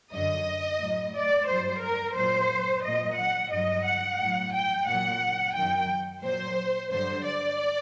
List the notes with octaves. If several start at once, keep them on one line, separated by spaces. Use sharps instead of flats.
F#2 D3 F#3 D#5
A2 F#3
D5
G2 F#3 C5
A#4
A#2 F#3 C5
A#2 F#3 D#5
F#5
G2 F#3 D#5
F#5
A2 F#3
G5
A#2 F#3 F#5
F#2 D#3 F#3 G5
A#2 F#3 C5
G2 D3 F#3 C5
D5